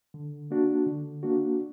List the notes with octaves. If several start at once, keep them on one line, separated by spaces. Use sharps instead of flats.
D3
A#3 D4 F#4
D3
A#3 D4 F#4